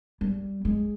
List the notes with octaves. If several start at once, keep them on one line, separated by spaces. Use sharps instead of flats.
G3
G#3